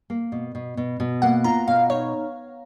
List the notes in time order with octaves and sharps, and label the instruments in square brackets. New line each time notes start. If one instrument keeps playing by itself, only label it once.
[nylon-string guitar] A#3
B2
B2
B2
B2
[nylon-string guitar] A#3 [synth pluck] F#5
[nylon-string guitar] F4 [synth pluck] A#5
[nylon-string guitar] B2 [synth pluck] F5
[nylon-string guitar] D#4 [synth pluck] C#5